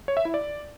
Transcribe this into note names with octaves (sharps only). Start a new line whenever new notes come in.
C#5
E5
E4
D5